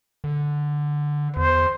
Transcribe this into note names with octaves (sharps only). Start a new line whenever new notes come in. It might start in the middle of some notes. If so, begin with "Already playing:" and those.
D3
E2 C5